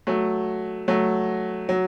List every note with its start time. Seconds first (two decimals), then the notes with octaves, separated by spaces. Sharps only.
0.07 F#3 A3
0.88 F#3 A3
1.69 F#3